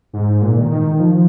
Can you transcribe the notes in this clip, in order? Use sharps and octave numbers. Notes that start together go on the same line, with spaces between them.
G#2
A#2
D#3
D#3
F3